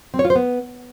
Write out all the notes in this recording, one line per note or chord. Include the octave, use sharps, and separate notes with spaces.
C4
C#5
F4
C5
B3